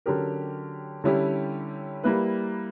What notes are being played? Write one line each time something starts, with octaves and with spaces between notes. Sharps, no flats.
D3 F#3 C#4 G4 A#4
D3 G3 C#4 E4 G4
G3 A#3 E4 B4